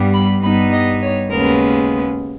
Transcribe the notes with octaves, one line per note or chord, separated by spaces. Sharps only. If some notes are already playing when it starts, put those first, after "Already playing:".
Already playing: G2 G3 B3
B5
G2 G3 B3 D#4 B5
D#5
C#5
D#2 C#3 G#3 B3 A#4